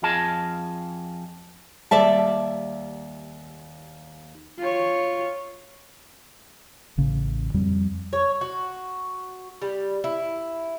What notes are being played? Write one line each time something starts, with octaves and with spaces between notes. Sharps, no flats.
F2 F4 G#4 D#5 A5
D#2 G3 D5 E5 A5
F4 C#5
A1 C#3
F2 G3
C#5
F#4
G3
E4